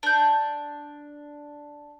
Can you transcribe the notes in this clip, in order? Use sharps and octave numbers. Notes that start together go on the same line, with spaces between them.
D4 G6